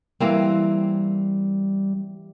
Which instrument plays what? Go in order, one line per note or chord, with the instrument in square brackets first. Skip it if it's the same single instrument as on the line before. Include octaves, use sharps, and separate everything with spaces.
[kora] E3 A#3 C4 [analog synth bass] G3